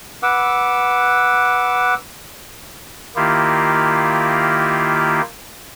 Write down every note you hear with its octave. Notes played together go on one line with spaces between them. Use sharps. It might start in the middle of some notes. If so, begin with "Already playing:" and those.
B4 F#5 D6 E6
D#3 A#3 E4 F4 G4